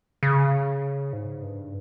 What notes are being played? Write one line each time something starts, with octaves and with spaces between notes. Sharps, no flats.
C#3
G#2
G2